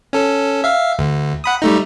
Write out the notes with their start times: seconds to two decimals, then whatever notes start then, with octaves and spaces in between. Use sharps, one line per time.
0.13 C#4 A4
0.64 E5 F5
0.99 D2
1.44 F#5 B5 D#6
1.62 G3 A3 D#4